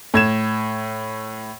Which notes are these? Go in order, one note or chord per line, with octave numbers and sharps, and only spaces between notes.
A2 G#6 E7